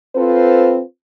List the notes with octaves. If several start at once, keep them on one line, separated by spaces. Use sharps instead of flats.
C4 F4 A4 B4 C5